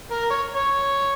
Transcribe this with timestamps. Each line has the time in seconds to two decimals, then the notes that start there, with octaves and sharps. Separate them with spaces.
0.11 A#4
0.30 C#5
0.55 C#5